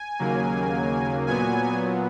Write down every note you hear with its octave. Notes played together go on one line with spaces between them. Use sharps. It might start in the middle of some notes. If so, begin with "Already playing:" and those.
Already playing: G#5
D#2 C#3 F#3 A#3
A#2 F#3 B3 G#5